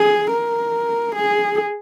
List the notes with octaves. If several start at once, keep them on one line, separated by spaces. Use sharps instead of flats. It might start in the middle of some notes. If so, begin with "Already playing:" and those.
Already playing: G#4
A#4
G#4